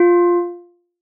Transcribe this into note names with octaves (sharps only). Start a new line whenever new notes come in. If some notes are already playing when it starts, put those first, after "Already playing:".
Already playing: F4